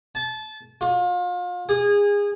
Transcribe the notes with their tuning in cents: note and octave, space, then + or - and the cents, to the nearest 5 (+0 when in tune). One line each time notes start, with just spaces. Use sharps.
A5 -25
F4 +35
G#4 -25